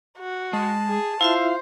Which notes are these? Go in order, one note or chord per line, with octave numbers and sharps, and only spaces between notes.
F#4
G#3 A5
G#4
E4 F4 C5 E5 F5